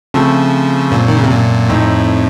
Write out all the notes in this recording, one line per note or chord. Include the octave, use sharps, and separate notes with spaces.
C#3 F3 A3 C4
F#2 A#2
D#3
C#3
C3
F#2 A#2
F2 A2 C4 D#4